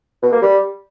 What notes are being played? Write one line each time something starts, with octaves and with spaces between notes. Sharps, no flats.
B2
A#3
G3